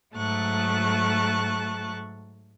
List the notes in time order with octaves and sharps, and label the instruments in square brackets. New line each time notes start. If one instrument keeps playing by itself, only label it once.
[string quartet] G#2 F#3 A3 A5 C#6 F#6